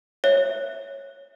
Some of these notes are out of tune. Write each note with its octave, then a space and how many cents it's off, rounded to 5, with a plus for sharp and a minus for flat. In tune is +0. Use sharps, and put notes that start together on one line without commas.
C#5 -10 E5 +0